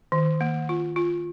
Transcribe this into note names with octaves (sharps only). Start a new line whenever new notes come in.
D#3
A#3
F4
F4